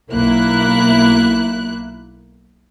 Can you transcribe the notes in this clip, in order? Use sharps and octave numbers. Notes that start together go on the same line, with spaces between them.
B1 A#3 E4 F#6